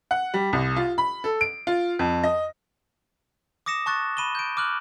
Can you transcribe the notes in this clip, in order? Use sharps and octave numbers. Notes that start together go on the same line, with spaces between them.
F#5
G3
C2
F4
B5
A4
D7
F4
F2
D#5
D6 D#6 A#6 C#7 E7
A5 C#6 F#6 A6
B5 D#7 E7 G7
G6 D7
D6 F6 F#6 F#7